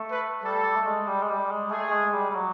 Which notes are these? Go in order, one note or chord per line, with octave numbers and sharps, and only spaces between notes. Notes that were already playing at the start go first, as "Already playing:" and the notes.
Already playing: A3
B4
G3 A4
G3
A3
G#3
G3
G#3
G3
G#3
A3 G#4
G#3
G3
G3
F#3